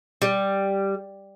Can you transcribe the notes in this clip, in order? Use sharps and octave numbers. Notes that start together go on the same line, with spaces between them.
G3